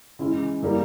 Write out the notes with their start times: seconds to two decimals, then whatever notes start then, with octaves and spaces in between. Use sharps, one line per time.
0.19 C#3 E3 G#3 C#4 E4
0.63 C#3 E3 G3 A#3